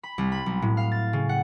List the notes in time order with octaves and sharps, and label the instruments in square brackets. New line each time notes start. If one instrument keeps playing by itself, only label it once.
[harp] B5
C2
B5
B1
A2
F5
A6
C#3
F#5